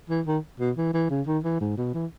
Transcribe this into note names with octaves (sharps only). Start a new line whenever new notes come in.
E3
D#3
B2
E3
E3
C#3
D#3
E3
G#2
B2
E3